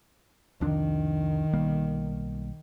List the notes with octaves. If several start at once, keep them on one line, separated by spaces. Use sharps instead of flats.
C2 F2 D#3 D4
B1 G3 A#3